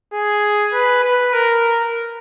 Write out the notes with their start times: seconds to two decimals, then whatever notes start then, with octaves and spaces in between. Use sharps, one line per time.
0.13 G#4
0.73 B4
1.04 B4
1.33 A#4